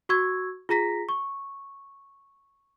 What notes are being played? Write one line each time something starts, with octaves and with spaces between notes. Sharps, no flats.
F#4 C#6 E6 G#6
F4 G#4 A#5 A#6 B6
C#6